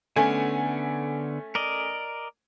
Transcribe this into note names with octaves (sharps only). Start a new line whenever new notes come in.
D3 A3 B3 C#4 G#5
A#4 D5 D#5